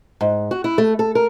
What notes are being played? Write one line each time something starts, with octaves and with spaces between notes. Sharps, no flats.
G#2
F#4
E4
A3
A4
A#4